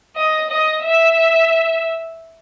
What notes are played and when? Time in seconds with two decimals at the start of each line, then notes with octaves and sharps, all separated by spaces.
0.16 D#5
0.50 D#5
0.83 E5